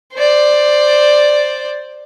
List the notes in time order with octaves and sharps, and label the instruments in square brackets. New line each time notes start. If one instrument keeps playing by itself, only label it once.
[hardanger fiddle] C5 D5